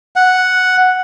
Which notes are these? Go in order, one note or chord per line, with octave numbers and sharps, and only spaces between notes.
F#5